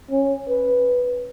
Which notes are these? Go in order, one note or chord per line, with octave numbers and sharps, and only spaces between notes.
C#4
B4